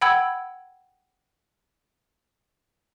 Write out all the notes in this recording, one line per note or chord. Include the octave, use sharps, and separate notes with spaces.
F#5 G5 B5 E6 G#6